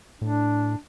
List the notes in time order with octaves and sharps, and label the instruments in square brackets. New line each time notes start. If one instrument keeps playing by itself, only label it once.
[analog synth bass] A2 [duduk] D4